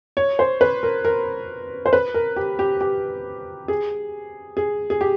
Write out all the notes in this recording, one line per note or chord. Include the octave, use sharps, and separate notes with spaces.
C#5
C5
B4
A#4
A#4
C5
B4
A#4
G4
G4
G4
G#4
G#4
G#4
G4